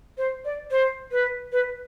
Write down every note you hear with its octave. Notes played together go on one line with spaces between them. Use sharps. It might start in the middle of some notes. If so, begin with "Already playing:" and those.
C5
D5
C5
B4
B4